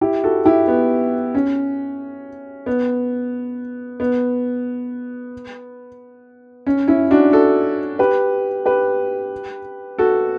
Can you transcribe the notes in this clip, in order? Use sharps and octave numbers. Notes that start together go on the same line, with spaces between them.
E4 G4
F#4 A4
E4 G4
B3
C#4
B3
B3
C#4
C#4 E4
D4 F#4
F#4 A4
G4 B4
G4 B4
F#4 A4